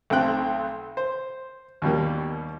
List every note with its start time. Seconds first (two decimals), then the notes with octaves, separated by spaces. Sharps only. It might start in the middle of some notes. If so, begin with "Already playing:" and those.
0.10 B1 A3 C4 G5 F#6
0.97 C5
1.82 D#2 B2 G3 A#3